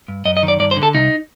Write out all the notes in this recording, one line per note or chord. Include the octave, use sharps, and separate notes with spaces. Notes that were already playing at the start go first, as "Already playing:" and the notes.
G2
F#2 D#5
D#5
D#3
D5
G2 D5
C5
D3
A4
C2 D#4